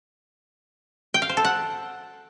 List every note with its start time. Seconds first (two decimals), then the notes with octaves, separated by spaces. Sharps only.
1.14 G5
1.22 F5
1.29 C5
1.37 A4
1.45 F#5